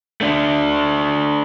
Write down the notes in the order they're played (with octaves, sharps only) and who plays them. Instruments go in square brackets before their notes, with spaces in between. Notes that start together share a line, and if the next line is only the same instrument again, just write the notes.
[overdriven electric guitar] A3 D4